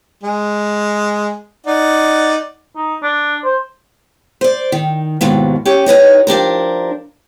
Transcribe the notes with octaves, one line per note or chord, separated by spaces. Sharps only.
G#3
D#4 D5 F#5
D#4
D4
C5
C5 D5
D#3
D#2 G#2 B2 D#3
C#4 G4 C#5
D#4 B4 C#5 D#5
F3 D4 G4 A#4